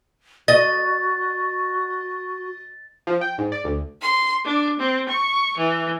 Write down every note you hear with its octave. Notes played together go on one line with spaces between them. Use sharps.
F#4 D#5 A6
F3
G5
G#2
D5
D2
C6
D4
C4
C#6
E3